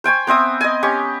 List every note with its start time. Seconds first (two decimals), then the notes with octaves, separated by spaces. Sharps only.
0.04 C5 G5 G#5 C#6
0.27 B3 C4 E5 D#6
0.61 D#5 G#5
0.83 C#4 G4 C#6